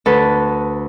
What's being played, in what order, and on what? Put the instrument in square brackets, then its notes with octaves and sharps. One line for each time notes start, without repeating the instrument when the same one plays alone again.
[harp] D2 A4 B4